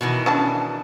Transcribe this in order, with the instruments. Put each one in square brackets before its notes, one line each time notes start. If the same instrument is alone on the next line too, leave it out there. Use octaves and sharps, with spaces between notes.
[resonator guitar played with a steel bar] B2 D#3 E3
[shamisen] C#4 D4 A5